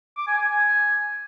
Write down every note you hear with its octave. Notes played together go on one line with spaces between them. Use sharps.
D6
G#5
G#5
G#5